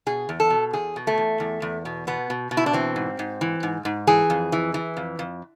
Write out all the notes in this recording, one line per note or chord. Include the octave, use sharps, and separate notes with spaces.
B2 G#4
E2
A4
B2
E2 G#4
B2
A3
E2
E2
E2
B2
B2 B3
B2
B2
E4
D4
E3 C4
G#2
G#2
E3
G#2
G#2
E3 G#4
F2
E3
E3
F2
F2